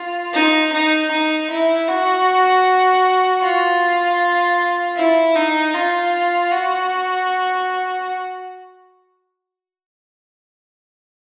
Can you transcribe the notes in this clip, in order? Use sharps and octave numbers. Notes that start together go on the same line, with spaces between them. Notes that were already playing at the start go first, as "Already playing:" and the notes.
Already playing: F4
D#4
D#4
D#4
E4
F#4
F4
E4
D#4
F4
F#4